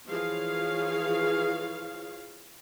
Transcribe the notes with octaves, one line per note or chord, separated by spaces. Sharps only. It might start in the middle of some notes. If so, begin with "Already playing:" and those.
E3 F3 G#4 C#5 F5